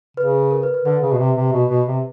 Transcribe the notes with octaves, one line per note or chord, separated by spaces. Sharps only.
C#3 B4
A#4
B4
B4
D3 B4
C#3
B2
C3
C3
B2
B2
C3